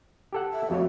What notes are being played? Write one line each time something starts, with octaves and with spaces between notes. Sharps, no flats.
G4 A4 F#5
E5
F2 A3 F#4 C#5